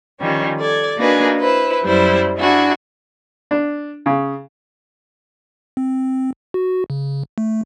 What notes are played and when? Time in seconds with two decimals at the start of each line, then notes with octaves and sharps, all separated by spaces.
0.20 D#3 F3 G3 C#4
0.57 A4 D5 G#6
0.99 A#3 D4 D#4 F#4 G#4 B4
1.37 E4 B4 C5
1.83 F#2 G3 E4 C5
2.37 D4 E4 F#4 G#4
3.51 D4
4.06 C#3
5.77 C4
6.54 F#4
6.90 C#3
7.38 A3